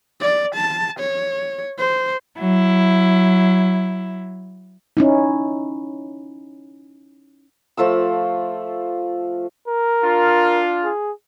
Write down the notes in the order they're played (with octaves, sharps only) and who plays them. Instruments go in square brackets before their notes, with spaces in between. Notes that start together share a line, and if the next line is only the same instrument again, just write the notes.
[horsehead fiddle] D5
A5
C#5
C5
[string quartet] F#3 E4
[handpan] C#4 D#4 E4
[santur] F3 A3 F4 E6
[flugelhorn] A#4
[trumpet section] D4 F4
[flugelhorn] G#4